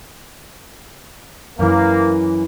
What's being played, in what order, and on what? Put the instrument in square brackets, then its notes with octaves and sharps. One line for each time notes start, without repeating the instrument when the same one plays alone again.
[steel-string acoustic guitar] F#2 E3 [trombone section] A#3